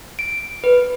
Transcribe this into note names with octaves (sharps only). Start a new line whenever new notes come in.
D7
B4